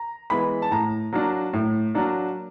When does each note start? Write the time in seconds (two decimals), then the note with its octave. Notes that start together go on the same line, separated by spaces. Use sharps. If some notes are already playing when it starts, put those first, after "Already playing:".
Already playing: A#5
0.30 E3 G#3 B3 B5
0.62 A5
0.71 A2 A#5
1.13 F#3 A#3 D4
1.53 A2
1.95 F#3 A#3 D4